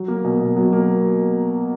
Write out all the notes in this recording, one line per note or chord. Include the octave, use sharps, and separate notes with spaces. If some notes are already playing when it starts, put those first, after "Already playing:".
Already playing: F#3
A#3
B2
B2
F#3
A#3